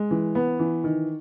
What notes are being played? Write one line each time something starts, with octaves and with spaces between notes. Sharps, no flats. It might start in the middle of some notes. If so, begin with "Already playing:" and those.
Already playing: G#3
E3
B3
E3
D#3